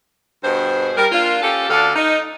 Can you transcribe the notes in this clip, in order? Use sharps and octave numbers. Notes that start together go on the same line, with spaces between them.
G2 B2 G#4 C5
G3 A#4
A#3 D4 F4
C#4 F4 G4 A4
D2 D3 D4 A4 F5
D#4